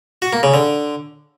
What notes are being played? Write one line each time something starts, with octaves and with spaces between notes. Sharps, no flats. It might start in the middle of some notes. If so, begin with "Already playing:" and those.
F#4
A#3
C#3
D3